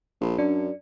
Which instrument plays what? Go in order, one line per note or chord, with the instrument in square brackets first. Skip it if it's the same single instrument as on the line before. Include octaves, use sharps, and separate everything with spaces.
[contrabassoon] A#1
[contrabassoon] F#2 [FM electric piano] D4